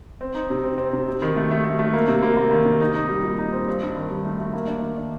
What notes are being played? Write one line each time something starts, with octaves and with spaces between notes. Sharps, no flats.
C4
D#4
C3
C4
C4
C3
C3
D#3
A3
A3
A3
A3
A#3
C3
A#3
A#3
D#3
C3
D#4
D#4
G3
A#2
D#4
C4
G2
G2
D#3
G2
A3
A3
A#3
D4
D#3
D4